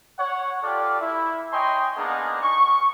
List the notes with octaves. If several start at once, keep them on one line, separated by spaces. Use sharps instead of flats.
C#5 F#5
F4 G4 A4 D5
E4
C#5 D#5 G5 G#5 A#5 C6
A#3 B3 D4 D#4 G#4
C#6